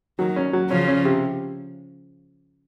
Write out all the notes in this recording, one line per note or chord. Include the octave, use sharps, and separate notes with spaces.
D#3 F#3
C#4
F#3
C#3 F3 C#4
C#4
C3